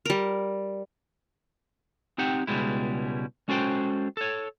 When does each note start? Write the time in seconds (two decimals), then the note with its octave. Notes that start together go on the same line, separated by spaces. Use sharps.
0.05 G3 A#4
2.18 C4 D#4 G4 F#5
2.47 C#2 B2 G3 G#3 E4
3.48 G#3 C#4 F#4 A4 C5 G5
4.17 A4 C#5